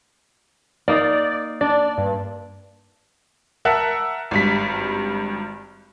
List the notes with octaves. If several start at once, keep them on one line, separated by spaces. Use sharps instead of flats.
A#3 D#4 D5
D4 D5
G2
A#4 E5 F#5 A5 F#6
G#1 G2 B6